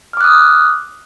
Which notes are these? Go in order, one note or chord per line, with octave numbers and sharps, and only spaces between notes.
D6 D#6 F6 F#6